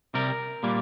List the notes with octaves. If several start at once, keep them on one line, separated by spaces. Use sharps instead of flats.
C2 C3 G3 A#4
A#2 G3 A#3